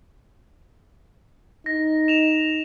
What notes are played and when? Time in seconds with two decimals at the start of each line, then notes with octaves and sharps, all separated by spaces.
1.66 D#4 A#6
2.08 E7 F7